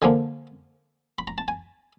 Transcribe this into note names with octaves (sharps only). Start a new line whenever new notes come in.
D3 F3 A#3 G#5
B5
A#5
A5
G#5